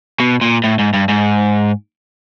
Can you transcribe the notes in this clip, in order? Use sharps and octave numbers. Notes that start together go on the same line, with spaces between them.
B2
A#2
A2
G#2
G2
G#2